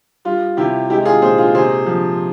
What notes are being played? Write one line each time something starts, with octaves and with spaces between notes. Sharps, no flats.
G3 F4
C3 E4 G4
G#3 E4 G4
F4 G#4
A#2 G#4 C5
F4 G#4
C3 G#4 C5
F3